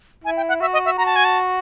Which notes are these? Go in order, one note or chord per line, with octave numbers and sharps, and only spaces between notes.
E4 G#5
G5
F#5
F#4 E5
D#5
E5
F#4 A#5
A5
G#5
A5